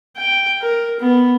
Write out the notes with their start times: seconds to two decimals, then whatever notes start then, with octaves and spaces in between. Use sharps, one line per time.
0.17 G5
0.62 A#4
1.00 B3